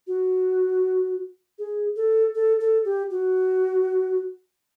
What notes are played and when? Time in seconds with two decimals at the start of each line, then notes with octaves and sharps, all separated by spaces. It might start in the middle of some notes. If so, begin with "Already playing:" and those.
0.07 F#4
1.59 G#4
1.96 A4
2.35 A4
2.60 A4
2.85 G4
3.11 F#4